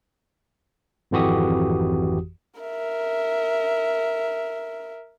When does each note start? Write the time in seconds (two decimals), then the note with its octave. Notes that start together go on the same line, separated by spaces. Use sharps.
1.11 G#1 F2 E3 F#4 G4 D#6
2.60 A#4 E5